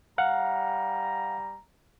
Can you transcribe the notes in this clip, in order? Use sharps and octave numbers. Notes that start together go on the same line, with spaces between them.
G3 F5 F#5 A#5